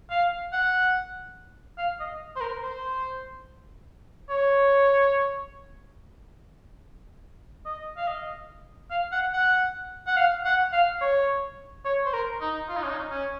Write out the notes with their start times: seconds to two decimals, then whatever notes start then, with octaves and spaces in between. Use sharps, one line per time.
0.10 F5
0.53 F#5
1.78 F5
2.00 D#5
2.36 C5
2.41 A#4
2.62 C5
4.30 C#5
7.65 D#5
7.97 F5
8.08 D#5
8.91 F5
9.12 F#5
9.33 F#5
10.07 F#5
10.17 F5
10.45 F#5
10.73 F5
11.01 C#5
11.85 C#5
12.05 C5
12.13 A#4
12.41 D#4
12.69 F4
12.76 D#4
12.83 C#4
12.90 D#4
13.11 C#4